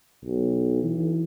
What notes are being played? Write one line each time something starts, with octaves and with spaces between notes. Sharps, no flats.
B1
E3